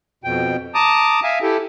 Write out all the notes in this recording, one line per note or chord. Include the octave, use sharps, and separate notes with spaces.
F2 B2 G5
A5 A#5 D6 D#6
E5 F5 G#5
E4 G4 A4